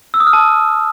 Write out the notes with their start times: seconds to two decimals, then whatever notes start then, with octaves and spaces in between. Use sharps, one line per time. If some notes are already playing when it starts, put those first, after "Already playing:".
0.14 E6
0.20 D#6
0.27 F6
0.33 A5